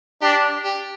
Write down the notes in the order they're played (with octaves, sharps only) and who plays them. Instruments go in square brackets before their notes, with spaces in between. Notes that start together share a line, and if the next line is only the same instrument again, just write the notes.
[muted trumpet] D4 [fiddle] G4
[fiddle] G4